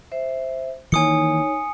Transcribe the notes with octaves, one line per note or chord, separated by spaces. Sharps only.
C5 E5
D#3 E3 A#3 D#4 C#5 G#5 D#6 C#7